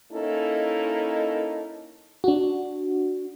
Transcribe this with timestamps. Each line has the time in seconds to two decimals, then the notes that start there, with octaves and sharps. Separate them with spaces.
0.11 A#3 C#4 D#4 E4 A4
2.24 D4 F#4